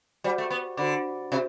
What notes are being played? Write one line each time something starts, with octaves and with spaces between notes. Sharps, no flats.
G3 F#4 C5 F#5 B5 D6
A3
B3
D3 F#4 C5 F#5 B5 D6
C3 F#4 C5 E5